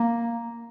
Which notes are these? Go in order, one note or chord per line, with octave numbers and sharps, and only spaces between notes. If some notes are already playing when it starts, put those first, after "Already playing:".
Already playing: A#3